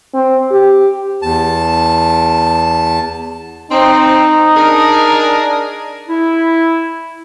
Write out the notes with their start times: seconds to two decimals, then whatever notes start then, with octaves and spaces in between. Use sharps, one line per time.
0.14 C4
0.51 G4
1.22 E2 A5
3.71 C4 D#4
4.57 D4 G#4 A#4
6.08 E4